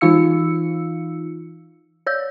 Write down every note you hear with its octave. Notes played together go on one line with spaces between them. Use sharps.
E3 D#4 F4 F5 E6 C#7
C#5 D5 E6 G6